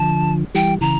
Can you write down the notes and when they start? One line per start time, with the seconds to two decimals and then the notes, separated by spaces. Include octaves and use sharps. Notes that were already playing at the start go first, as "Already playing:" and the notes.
Already playing: D3 F3 A5
0.55 E3 G3 G5
0.81 C#3 E3 A#5